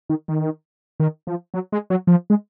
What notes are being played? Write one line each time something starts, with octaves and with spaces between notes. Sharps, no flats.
D#3
D#3
D#3
F3
F#3
G#3
F#3
F3
G#3